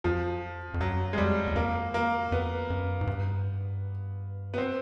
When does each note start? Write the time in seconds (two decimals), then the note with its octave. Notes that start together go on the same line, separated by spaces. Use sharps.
0.04 F2 F3
0.74 F2
0.80 F#2 F#3
1.13 G#3
1.18 F2 G3
1.47 E2
1.55 F2 A#3
1.94 A#3
2.32 F2 B3
2.70 F#2
3.01 G#2
3.07 G2
4.54 B3
4.58 C4